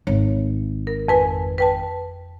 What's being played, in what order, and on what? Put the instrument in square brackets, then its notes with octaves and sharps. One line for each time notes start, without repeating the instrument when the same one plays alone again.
[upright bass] G#1 [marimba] C#5
[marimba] A#4
F2 B4 G#5
B4 G5 A5